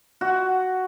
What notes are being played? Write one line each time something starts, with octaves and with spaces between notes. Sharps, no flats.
F#4